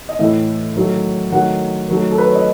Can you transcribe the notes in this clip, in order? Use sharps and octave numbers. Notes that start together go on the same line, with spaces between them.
D#5
A2 E3 A3 E5
D#3 F#3 A3
D#3 F#3 A3 F#5
D#3 F#3 A3
A4
B4
C#5
D#5